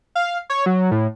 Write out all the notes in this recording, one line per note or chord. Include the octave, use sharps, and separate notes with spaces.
F5
C#5
F#3
A2